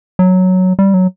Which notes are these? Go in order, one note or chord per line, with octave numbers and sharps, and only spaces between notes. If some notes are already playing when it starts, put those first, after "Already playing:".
F#3
G3
F#3